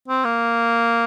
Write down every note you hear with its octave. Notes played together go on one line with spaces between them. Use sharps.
C4
A#3